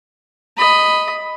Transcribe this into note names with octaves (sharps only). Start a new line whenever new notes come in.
D#5 B5